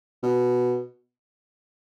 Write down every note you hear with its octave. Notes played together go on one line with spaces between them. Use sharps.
B2